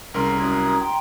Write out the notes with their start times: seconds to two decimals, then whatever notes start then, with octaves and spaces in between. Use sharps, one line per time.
0.14 C2 C#3 A#4 A#5 C6
0.41 F#2 D#6 F#6 G#6
0.80 G5 C6